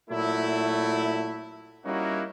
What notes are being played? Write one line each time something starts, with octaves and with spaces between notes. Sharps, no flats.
A#2 F#3 A3 E4
G3 A#3 C#4 D#4 E4 F#4